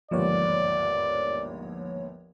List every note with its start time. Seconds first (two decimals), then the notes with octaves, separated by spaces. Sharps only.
0.11 G1 D#2 G#2 F3 C#5 D5